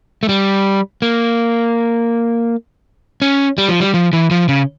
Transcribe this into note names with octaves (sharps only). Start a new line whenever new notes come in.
A3
G3
A#3
C#4
G3
F3
G3
F3
E3
F3
C#3